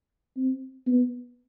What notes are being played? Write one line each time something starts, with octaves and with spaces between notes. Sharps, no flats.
C4
B3